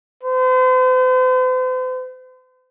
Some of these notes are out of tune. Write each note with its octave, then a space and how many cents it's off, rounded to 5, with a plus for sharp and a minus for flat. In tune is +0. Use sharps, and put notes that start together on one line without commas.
C5 -45